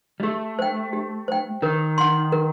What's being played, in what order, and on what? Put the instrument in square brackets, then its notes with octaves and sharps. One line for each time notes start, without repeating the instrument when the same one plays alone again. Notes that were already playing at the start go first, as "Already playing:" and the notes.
[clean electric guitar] G3
[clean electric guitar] A3 [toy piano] G4
[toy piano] C5 G5
G4
C5 G5
[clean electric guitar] D#3 [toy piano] A#4
[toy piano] F#5 C6
A#4